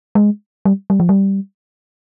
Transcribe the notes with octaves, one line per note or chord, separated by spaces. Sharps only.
G#3
G3
G3
F3
G3